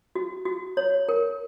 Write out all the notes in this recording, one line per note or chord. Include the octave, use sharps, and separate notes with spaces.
F#4
F#4
C#5
A#4